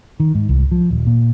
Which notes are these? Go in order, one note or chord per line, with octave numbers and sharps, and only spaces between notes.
D#3
G#2
C2
F3
D#1
A#2